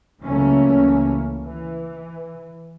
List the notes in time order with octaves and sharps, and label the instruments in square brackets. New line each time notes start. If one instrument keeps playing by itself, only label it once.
[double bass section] C#2 E3 F#3 A3 A#3 C#4
E3